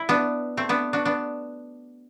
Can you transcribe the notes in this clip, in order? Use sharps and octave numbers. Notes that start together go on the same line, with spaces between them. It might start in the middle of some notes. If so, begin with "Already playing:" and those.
Already playing: E4
B3 D4
A3 C4
B3 D4
D4 F#4
B3 D4